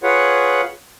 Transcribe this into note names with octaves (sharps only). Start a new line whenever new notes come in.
F4 G#4 B4 C#5 F#5